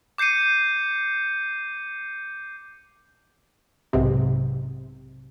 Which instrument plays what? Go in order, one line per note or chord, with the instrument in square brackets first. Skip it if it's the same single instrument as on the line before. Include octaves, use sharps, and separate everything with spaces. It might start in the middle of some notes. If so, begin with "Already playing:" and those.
[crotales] D6 G6 C7 C#7 D#7
[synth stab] B1 G#2 C3